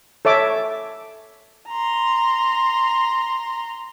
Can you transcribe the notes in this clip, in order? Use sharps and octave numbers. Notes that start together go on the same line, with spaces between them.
A4 C#5 E5 D6
A#5 C6